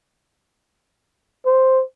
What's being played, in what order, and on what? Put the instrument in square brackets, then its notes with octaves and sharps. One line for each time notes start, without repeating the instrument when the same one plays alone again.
[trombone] C5